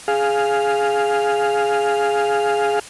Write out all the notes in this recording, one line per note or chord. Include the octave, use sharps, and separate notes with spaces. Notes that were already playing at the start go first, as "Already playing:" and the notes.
G#4 F5